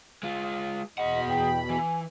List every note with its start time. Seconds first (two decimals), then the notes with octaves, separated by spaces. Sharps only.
0.23 G#3 F4
0.98 E2 B2 G#4 D#5 F#5 B5
1.29 G5
1.70 E3 G#5